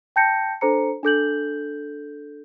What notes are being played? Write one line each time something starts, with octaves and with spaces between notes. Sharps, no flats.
G5 A5 G6 A#6 C#7
D4 A4 C5 A#5 C#7
D4 A4 G6 F#7